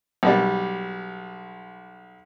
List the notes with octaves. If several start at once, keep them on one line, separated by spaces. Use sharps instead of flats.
B1 G3